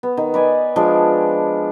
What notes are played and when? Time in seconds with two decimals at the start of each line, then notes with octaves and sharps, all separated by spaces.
0.03 B3
0.17 D#3
0.34 B4 D5 G#5
0.76 F3 G#3 D4